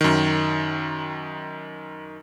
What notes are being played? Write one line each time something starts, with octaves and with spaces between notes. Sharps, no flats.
F#2 D#3